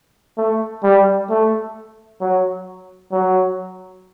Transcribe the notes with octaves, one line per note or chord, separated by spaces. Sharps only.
A3
G3
A3
F#3
F#3